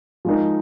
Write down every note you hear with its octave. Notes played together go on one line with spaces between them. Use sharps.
F3 G#3 D#4 A#4